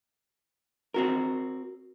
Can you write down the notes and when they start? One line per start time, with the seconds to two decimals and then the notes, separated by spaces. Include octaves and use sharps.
0.94 C4 F#4 A#4